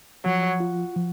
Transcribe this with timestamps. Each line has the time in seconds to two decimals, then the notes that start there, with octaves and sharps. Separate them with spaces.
0.25 F3 F#3
0.60 F4
0.96 F3